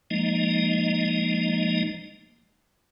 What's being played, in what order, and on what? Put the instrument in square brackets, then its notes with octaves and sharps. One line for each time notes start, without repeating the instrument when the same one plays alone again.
[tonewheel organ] F3 G#3 A#3 D#4 D#5